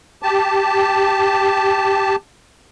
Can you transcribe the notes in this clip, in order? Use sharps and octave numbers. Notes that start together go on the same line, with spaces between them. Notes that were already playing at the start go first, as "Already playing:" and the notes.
G4 A5